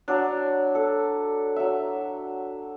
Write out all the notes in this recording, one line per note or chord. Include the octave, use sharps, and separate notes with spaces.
F#3 D4
A4
F#3 E5